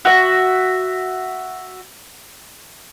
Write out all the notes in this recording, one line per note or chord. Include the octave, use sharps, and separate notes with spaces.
F#4 E5